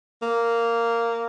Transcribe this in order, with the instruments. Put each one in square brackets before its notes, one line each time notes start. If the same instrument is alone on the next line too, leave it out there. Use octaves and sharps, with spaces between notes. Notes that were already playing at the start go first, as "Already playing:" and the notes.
[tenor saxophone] A#3